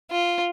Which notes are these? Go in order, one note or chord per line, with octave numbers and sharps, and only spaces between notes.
F4